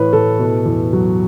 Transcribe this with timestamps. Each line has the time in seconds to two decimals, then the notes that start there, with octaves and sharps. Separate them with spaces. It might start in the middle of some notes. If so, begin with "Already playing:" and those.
Already playing: A2 E3 B4 C#5
0.13 A2 A4
0.39 B2
0.65 E2
0.93 F#3